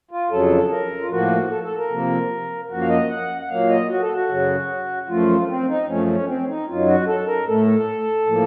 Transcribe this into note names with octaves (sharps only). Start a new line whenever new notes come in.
F4
F2 C#3 F#3 A4
A#4
F4
A2 F3 A#3 F#4
A4
A4
A#4
C3 F3 A#3
F#2 F3 A#3 F#4
F5
D#5
F#5
F#5
A#2 F#3 A#3 F5
D#5
F#4
A4
F#4
F#2 C#3 F#3
F#2 F3 A3 F4
C4
D#4
F#2 F3 A3 C#4
C#4
C4
D#4
F#2 D#3 F#3 F4
F#4
A4
A#4
A2 A3 A4
A4
A2 F3 A#3